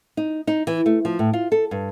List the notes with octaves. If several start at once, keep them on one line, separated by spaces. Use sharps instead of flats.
D#4
D#4
E3
A3
F3
A2
F4
A4
G2